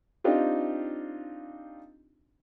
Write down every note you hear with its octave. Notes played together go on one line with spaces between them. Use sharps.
C4 D4 D#4 F4 G4